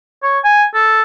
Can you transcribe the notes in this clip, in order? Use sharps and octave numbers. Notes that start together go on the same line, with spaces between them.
C#5
G#5
A4